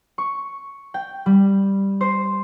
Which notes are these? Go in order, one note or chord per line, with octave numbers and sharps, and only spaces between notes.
C#6
G5
G3
C5